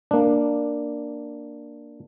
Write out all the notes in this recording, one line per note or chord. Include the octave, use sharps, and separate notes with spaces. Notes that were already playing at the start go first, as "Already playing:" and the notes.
A#3 D4